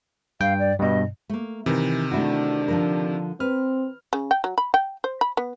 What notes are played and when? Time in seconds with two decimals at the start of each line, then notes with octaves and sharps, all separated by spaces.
0.41 G2 F5 G5
0.59 D5
0.80 G2 B2 D#5
1.30 A3 A#3
1.66 C3 D#3 E3 A#4
2.11 A3 D4 E4 F#4
2.68 D3 F3 A#4
3.40 C4 B4 F6
4.13 C#3
4.31 G5
4.44 F#3
4.58 B5
4.74 G5
5.04 C5
5.21 B5
5.37 B3